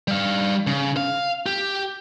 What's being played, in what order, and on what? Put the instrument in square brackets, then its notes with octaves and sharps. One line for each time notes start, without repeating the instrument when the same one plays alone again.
[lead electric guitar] G3 F5
C#3
F5
G4